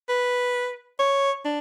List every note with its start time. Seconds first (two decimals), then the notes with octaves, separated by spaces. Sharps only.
0.09 B4
0.99 C#5
1.45 D4